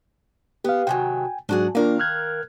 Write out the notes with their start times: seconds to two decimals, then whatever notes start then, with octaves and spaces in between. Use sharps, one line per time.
0.64 B3 G4 F5
0.87 C3 D#3 F#3 G5 G#5
1.49 G#2 F#3 D4 F#4 G#4
1.75 D#3 A#3 D4 F4 A#4 F5
1.99 F6 F#6 G#6